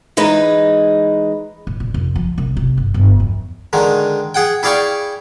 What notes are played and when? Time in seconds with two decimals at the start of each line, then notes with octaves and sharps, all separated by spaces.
0.17 E3 G#3 D#4 B4
1.67 A1
1.80 A#2
1.94 F1
2.16 F3
2.38 C2
2.56 C3
2.77 G1
2.94 G1
3.20 F2
3.73 D3 D#3 G#3
4.35 G#4 F#5 G5
4.63 E4 G#4 D5 F5 G5 C#6